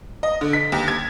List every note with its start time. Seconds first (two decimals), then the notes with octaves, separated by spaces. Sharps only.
0.23 D#5
0.41 D3
0.53 B6
0.72 D#2
0.88 G#6